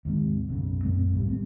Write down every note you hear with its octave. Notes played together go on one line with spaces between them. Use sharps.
D#2 G#2 C3
B1 F#2 C#3
F#2 A#2 A3 C4
B1 A2 F3 G3
G3 G#3 C4